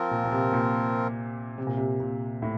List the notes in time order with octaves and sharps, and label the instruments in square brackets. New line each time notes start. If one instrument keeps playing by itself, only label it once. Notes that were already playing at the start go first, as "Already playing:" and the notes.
Already playing: [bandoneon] F3 C4 F4 A#4
[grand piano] A#2
A#2
C3
A#2
C3
A#2
C3
A#2
A2